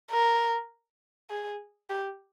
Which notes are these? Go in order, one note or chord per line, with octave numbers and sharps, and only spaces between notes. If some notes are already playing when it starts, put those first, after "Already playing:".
A#4
G#4
G4